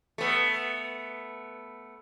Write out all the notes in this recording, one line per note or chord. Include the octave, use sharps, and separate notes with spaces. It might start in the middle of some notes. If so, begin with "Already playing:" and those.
A3 B3